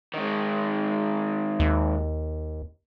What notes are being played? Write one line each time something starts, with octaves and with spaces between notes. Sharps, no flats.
D#3 G#3
D#2